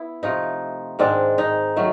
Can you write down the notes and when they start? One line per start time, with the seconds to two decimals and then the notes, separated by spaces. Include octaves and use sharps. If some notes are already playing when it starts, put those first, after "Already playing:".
Already playing: B3 E4
0.23 C3 F3 A3 D#4
0.99 G#2 D#3 G#3 C4 D4
1.38 D#4
1.76 D#3 F#3 A3